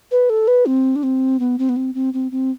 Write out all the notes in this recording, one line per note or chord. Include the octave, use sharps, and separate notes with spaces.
B4
A4
B4
C4
D4
C4
B3
C4
B3
C4
C4
C4
C4